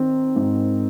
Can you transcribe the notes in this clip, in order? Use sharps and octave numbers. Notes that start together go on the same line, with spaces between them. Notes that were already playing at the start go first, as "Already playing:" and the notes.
Already playing: D#3 C4
G#2